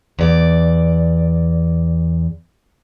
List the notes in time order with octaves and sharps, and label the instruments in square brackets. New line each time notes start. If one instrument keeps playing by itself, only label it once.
[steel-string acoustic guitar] E2 D5